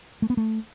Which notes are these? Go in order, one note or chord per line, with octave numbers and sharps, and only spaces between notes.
A3
B3
A3